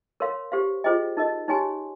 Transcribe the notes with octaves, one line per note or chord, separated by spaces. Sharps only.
A#4 C#5 F5 C6
G4 C5 F5
F4 G#4 C5 D#5 G5
D#4 A#4 D#5
D#4 G4 C#5 G#5 C6